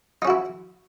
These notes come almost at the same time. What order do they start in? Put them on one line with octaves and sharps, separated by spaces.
D#4 C#4 F#4 E4